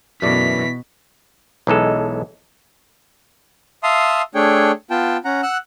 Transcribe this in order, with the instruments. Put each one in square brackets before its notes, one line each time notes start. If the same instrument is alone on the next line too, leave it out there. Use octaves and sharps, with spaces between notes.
[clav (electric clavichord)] F#2 A3 D5 [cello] B2 [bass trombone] E3 [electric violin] B6
[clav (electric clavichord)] B1 E3 G#3 A4
[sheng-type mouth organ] E5 F5 A5 C6 D#6
A3 D4 G#4 C#5 G5
B3 F4 G5 A5
C#4 F#5 A#5
F#5 E6 F#6